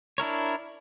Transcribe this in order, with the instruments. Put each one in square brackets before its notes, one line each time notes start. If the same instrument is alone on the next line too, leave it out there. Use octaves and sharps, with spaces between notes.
[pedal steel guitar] D4 E4 A#4 C#5